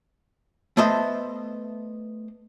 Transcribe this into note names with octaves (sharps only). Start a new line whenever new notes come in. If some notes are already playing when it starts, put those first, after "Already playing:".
A3 B3 C5 D#5 E5 A5